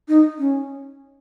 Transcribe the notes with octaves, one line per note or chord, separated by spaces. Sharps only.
D#4
C#4